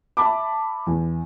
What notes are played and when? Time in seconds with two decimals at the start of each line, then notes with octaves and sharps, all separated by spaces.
0.17 E5 A5 B5 D6
0.87 E2